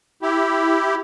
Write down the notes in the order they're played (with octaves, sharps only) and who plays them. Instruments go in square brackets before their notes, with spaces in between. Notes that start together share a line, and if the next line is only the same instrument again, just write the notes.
[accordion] E4 G4